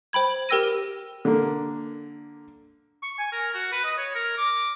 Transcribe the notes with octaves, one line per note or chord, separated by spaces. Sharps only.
C5 G5 B5 G#6
G4 A#4 G5 E6 A#6 D#7
D3 A#3
C#6
G#5
A#4
F#4
B4
D#5
C#5
A#4
D6